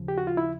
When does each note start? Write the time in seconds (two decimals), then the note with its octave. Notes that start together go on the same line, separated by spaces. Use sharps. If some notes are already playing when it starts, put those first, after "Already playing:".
Already playing: D#2 C#3 F3
0.08 G4
0.18 F#4
0.27 F4
0.37 E4